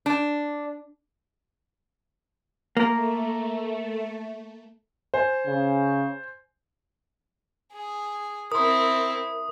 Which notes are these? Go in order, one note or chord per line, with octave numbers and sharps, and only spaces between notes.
D4
A3 A#3 A#4
C5 G#5
C#3
G#4
C4 E4 A#4 C6 D#6